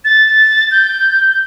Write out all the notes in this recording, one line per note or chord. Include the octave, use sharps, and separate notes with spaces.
A6
G6